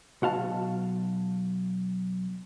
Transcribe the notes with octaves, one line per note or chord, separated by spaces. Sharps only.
B1 F#4 F5 A5